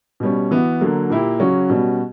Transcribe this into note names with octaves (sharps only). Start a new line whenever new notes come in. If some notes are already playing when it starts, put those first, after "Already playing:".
B2 G3 C#4
E3 B3 F#4
D3 F#3 A#3
A#2 A#3 E4 G4
C#3 F#3 C#4 F#4
B2 G3 C#4 F#4